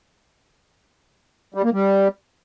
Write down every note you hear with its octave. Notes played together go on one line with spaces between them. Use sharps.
G3
A#3
G3